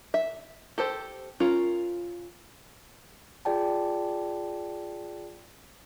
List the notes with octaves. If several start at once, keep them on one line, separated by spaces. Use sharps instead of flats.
E5
G4 A4 C5
C#4 F4 A#4
F4 G#4 D5 G5 A5